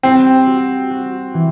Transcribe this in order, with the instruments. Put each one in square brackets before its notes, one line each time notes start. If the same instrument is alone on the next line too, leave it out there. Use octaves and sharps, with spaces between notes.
[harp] G3 [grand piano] C4
[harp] F#4
F#4
E3